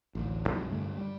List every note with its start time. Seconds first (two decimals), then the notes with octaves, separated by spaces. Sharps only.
0.15 A1 D2
0.47 C2 G#2 C3 F#3
0.70 G2 D3 A3
0.97 G3